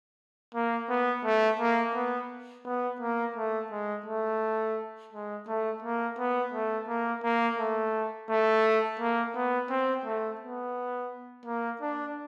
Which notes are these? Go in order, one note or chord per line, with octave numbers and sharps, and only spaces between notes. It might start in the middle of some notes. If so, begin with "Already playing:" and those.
A#3
B3
A3
A#3
B3
B3
A#3
A3
G#3
A3
G#3
A3
A#3
B3
A3
A#3
A#3
A3
A3
A#3
B3
C4
A3
B3
A#3
D4